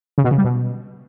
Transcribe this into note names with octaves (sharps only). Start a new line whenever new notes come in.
C#3
B2
C#3
G3
B2